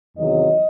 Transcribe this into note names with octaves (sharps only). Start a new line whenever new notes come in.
E2 C3 D#3 F#3 D#5